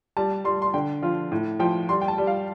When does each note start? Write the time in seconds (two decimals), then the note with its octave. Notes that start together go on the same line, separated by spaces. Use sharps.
0.17 G3 A5
0.44 G3 C6
0.62 C6
0.74 D3 G5
1.02 F3 F4
1.32 A2
1.59 F3 G5
1.89 G3 C6
2.01 G5
2.08 A5
2.18 G3
2.27 F5